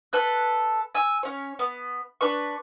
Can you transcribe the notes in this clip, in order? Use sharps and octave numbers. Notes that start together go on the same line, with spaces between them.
A4 B4 F#6
G#5 E6
C#4 C#5
B3
D4 B4 C#6